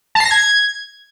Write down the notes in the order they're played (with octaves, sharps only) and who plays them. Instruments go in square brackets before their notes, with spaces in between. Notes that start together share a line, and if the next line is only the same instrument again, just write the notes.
[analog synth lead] A5
C7
A#6
G#6